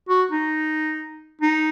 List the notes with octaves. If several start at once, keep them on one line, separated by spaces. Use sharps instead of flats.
F#4
D#4
D#4